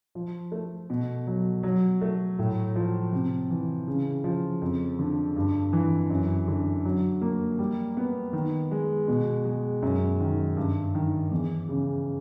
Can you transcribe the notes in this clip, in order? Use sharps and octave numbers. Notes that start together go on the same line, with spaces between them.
F3
A3
B2
F#3
F#3
A3
A2
F3
C3
E3
C#3
F3
F2
D3
G2
E3
F#2
D3
F#3
A#3
G3
B3
D#3
G#3
B2
G#3
F#2
D#3
G2
D#3
E2
C#3